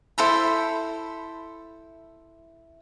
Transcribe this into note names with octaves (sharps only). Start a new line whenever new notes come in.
E4 A4 C5 B5